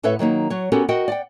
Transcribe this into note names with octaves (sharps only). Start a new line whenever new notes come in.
A2 A4 B4 C#5 E5 F#5
D#3 F#3 A#3 D#4
F#3 C#5
B3 C#4 F#4 G4 A4 A#4
F#4 A#4 D#5 F#5 G5
D5 F#5 G5